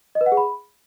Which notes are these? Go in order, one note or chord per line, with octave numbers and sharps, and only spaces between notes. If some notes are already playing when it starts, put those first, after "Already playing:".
D#5
B4
F#5
G#4
B5